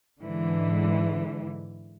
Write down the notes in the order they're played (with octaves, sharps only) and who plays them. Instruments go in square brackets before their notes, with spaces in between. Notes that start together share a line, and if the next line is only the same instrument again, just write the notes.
[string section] G#2 D3 E3